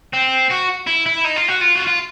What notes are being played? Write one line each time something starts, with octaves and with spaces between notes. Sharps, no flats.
C4
F#4
E4
E4
D#4
F4
F#4
F4
F#4
F4